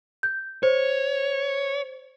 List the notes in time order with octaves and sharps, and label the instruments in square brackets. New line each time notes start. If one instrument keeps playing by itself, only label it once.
[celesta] G6
[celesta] C5 [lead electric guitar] C#5